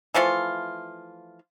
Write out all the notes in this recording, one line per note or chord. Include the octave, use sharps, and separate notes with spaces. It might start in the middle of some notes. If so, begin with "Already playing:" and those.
E3 F3 A3 F4